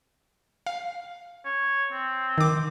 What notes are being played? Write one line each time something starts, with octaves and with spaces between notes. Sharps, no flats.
F5
C#5
C4
D#3 D6